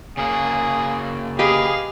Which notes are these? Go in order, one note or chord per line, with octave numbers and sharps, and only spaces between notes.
C#3 A#3 G#4
G4 G#4 B4 D#5 F5 B5